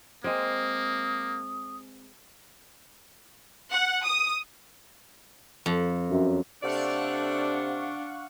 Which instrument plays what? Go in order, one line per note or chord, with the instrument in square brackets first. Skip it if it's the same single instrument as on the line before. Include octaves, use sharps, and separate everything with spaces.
[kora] G#3 C4 [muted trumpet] A#3 [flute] D#6
[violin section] F#5
D#6
[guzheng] F2
[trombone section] F#2
[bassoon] C3 [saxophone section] A3 A4 D5 [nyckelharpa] D4 [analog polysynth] F5 F#5 C#6